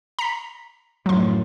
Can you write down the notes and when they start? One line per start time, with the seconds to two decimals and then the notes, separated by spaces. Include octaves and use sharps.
0.19 A#5 B6
1.06 F#2 A2 F3 F#3 C6